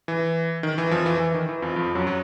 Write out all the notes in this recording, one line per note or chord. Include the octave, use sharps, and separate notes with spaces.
E3
D#3
E3
F2 F3
E3
E3
D#3
E3
F2 F3
F2 F3
F#2 F#3
F#3